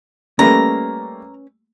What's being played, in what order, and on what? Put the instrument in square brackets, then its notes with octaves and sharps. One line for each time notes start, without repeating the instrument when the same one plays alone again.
[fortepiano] G3 A3 A#3 [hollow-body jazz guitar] C#4 B4 B5 [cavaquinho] A#5